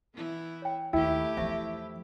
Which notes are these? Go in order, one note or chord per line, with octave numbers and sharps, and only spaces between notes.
E3 B3 E4
C#5 G5
D#2 A3 E4 G4 G5
E2 F3 C5 E5 C#6